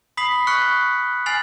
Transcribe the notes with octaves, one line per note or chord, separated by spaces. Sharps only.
B5 D#6 B6 C7 F#7
C#6 F6 F#6 B6 C#7
G#5 F6 A6 C7 F7 F#7